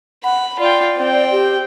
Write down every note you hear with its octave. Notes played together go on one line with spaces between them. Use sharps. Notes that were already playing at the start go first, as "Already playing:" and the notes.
F#5 B5
F4 D5 G5
C4 G5
G4